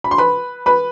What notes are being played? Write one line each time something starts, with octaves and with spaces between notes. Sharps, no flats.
B5
C6
B4 B5
B4 B5